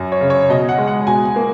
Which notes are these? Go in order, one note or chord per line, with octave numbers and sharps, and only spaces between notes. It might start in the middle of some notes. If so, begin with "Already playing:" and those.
Already playing: F#2
C#5
C#3
C#5
B2 D#5
F#5
G#3
F#5
B2 G#5
G#5
A#3